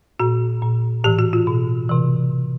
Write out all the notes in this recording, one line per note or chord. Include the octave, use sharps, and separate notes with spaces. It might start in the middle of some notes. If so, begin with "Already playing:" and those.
A#2 F#4
A#2
A2 E3 G4
F#4
F4
B2
C3 E3